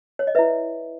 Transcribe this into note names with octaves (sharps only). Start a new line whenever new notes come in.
C#5
D#5
E4 B4 E5